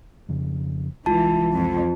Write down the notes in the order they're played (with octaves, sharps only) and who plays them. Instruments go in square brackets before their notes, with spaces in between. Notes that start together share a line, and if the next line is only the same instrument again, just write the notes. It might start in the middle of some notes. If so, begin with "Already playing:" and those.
[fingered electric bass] F2 C#3
[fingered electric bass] C2 G#3 [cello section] E3 [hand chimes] F4 A5
[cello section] F2